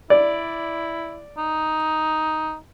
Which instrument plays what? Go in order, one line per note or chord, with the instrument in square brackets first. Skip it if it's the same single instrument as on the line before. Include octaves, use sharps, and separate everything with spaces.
[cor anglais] E4 [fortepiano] D5
[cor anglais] D#4